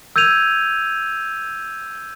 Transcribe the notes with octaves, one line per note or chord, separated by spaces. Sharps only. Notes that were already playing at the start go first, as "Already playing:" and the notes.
E6 G6 G#6 D#7 F7